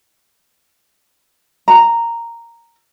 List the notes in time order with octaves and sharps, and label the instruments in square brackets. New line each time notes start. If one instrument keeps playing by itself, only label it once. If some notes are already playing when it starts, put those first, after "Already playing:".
[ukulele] A#5